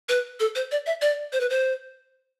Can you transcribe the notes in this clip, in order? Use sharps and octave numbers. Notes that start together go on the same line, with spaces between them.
B4
A4
C5
D5
E5
D5
C5
B4
C5